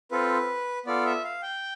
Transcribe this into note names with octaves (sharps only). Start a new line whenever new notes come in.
C4 F4 A4 B4
B3 F4 A4 D5
E5
F5
G5